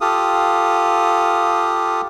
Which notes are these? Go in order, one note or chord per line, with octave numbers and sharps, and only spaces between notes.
F4 G4 A4 F5 D#6